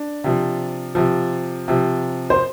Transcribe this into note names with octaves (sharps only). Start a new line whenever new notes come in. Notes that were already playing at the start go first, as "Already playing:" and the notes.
Already playing: D4
C3 F3
C3 F3
C3 F3
C5